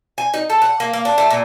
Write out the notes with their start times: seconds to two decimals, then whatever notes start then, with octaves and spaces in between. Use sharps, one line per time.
0.18 G#5
0.34 D#4
0.50 A4
0.62 F#5
0.80 A#3
0.93 A#3
1.05 D4
1.18 A3
1.30 A#2